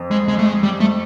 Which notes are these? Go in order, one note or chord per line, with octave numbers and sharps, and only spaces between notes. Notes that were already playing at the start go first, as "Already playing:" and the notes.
Already playing: F2
G#3
G#3
A3
G#3
G3
A3